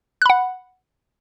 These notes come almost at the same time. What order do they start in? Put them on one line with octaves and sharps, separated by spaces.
F#6 B5 F#5